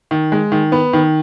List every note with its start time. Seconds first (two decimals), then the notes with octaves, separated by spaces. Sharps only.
0.11 D#3
0.32 G#3
0.52 D#3
0.72 B3
0.93 D#3